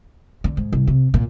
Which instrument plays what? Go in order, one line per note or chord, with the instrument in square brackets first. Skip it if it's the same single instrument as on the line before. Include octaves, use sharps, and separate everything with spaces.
[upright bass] D3
G#2
C2
C3
A#2